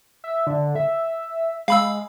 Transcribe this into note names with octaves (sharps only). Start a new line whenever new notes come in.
E5
D3
E5
G#3 F5 B5 E6